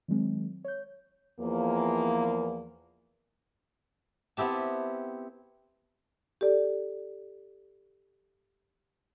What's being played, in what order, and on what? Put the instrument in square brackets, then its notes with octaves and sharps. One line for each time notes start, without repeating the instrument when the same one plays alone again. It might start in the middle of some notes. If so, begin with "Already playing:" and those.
[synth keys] D#3 F#3 G#3 C4
C#5 G6
[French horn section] E2 F3 A#3
[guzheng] B3 C4 E4 G4 A5
[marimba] G4 A4 D5